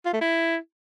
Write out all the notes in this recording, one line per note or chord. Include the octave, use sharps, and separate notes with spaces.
F4
A3
E4